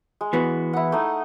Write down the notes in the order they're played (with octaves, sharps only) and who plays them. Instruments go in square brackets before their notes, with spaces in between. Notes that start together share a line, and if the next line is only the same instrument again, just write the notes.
[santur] G#3
[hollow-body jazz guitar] E3 B3 F#4
[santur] E4 F#5
A3 D#4